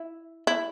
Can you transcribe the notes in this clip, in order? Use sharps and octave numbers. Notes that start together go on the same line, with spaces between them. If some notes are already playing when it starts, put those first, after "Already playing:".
Already playing: E4
E4